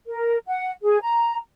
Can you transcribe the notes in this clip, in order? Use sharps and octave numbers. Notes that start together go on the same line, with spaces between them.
A#4
F#5
G#4
A#5